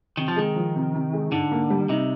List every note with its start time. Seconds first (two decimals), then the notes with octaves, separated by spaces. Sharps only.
0.17 C3 D#3
0.28 F3
0.36 D#3 G#3
0.56 F3
0.76 C3
0.95 C3
1.13 G#3
1.32 G#2 D3
1.52 A#3
1.70 G3
1.89 C3 D#4